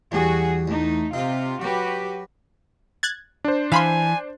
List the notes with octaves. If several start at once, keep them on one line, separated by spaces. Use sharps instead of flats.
E2 G3 F#4 G#4
E2 A3 D#4
C3 D#4 F4 C5
F#3 F#4 G4 B4
F#6 G#6 A6
D4 C5
E3 F5 G#5 B5 C6